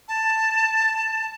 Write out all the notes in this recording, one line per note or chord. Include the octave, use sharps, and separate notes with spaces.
A5